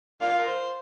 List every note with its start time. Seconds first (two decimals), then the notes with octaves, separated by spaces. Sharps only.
0.21 A#3 D4 F4 F5
0.38 A#4
0.47 C5